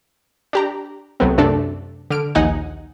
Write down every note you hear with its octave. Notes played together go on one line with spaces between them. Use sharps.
D4 G4 A#5
C2 F#3 A3 B3 C4
F#2 C3 A3 D4 A4 D5
D3 F6 D7
A#1 D#2 D#4 D#5 F#5 G#5